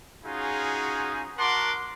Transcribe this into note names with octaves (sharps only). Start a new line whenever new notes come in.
C#4 D#4 F4 F#4 G#4
F#4 A#4 F#5 A5 C6 D6